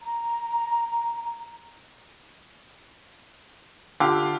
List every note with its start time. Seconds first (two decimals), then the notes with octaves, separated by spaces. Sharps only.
0.03 A#5
4.00 D3 F4 G4